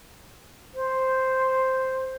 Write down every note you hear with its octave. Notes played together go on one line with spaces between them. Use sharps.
C5